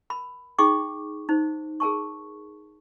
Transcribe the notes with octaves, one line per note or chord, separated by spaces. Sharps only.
A#4 B5
D#4 G#4 G5 C#6 D6
D#4 C5
G#4 A#4 A5 C#6